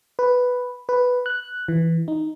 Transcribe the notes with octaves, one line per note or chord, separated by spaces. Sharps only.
B4
B4
F#6
E3
D#4